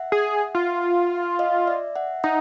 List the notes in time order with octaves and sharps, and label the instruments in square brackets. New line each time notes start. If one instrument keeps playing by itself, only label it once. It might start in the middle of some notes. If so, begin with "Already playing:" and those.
Already playing: [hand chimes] E5 F#5
[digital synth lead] G#4
F4
[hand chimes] D#5 F5
D5 E5
E5 F#5
[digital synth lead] D#4 [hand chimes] E5 F#5